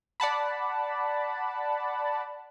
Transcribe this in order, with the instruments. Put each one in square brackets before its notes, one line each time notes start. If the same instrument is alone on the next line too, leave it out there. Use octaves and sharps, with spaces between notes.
[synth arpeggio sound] D5 F#5 A5 B5